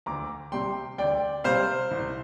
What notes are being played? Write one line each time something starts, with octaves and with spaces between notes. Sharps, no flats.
D2 A#5 D6
C3 G3 G5 C6
D2 D5 G5
C3 G3 C5 F5
C2